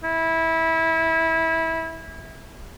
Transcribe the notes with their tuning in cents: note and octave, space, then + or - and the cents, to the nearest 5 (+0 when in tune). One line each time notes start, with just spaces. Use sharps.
E4 -20